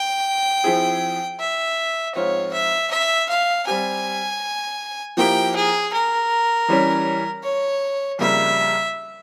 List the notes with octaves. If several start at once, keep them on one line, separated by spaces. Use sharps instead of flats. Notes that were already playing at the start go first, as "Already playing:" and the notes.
Already playing: G5
F3 C4 E4 G#4
E5
G#2 F3 C4 F4 C#5
E5
E5
F5
G3 C4 G4 G#5
F3 A#3 E4 G4 G5
G#4
A#4
E3 G3 C#4
C#5
F2 C#3 G3 A#3 E5